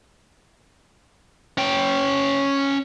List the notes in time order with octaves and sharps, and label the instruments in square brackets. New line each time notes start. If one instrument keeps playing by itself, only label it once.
[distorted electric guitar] C#4 G5